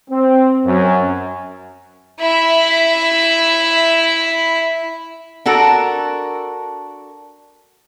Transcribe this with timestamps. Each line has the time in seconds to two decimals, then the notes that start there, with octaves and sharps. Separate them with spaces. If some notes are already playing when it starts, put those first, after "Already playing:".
0.10 C4
0.66 F#2
2.20 E4 E5
5.46 D4 F#4 A4 A#4